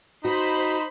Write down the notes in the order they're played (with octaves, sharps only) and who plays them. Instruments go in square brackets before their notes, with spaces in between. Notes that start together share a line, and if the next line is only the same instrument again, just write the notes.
[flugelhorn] D#4 [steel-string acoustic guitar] F#4 D#5 [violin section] C5 B5